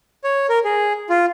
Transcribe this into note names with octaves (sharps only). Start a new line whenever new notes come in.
C#5
A#4
G#4
F4